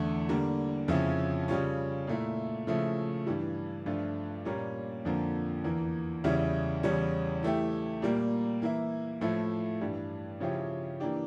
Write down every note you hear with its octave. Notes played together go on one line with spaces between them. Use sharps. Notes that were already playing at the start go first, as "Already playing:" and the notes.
Already playing: E2 D3 A3
D3 G3 A#3
F2 C#3 F3 C#4 E4
C#3 G3 C#4 F4
A#2 A3 E4
C#3 F3 A3 E4
G2 E3 G3
G2 F3 A3 D4 F4
A#2 G3 A#3 C#4
F2 D3 F3 A#3
E2 E3 A#3
E2 C#3 G3 C#4 E4
E2 C#3 G3 C#4
E3 A3 E4 G4
A#2 G3 A#3
E3 A#3 E4
A2 F3 A3 E4
G2 E3 G3
C#3 F3 C#4 E4 G4
E3 A#3 D4 G4